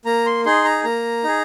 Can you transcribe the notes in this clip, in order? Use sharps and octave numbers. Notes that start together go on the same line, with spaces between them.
A#3 A#5
C6
D#4 G#4 C6
A#5
A#3 A#5
D#4 G#4